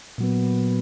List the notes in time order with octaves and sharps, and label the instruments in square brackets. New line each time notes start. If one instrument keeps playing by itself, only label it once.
[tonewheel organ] A#2 F#3 B3